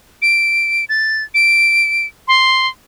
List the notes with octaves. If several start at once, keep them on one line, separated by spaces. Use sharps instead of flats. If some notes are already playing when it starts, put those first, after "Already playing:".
D7
A6
D7
C6